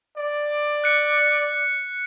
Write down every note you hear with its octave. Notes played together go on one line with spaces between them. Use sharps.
D5
F#6 C#7